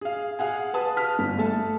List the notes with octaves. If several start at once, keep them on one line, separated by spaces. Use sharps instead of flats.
G#4 F5
G#4 F5 F#5 G#5
B4 A5 D#6
A5 F6 B6
G1
A3 A4 A5